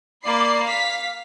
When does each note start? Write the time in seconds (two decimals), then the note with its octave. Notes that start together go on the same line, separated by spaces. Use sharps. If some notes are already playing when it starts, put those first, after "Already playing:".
0.24 A#3 D5 B5 C7
0.66 F5 B6